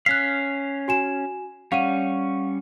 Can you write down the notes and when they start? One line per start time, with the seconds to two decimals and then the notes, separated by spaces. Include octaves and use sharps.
0.06 C#4 F5 F#6 B6
0.88 F#4 G#5 E7
1.72 G3 C#4 F5 F#5 D#7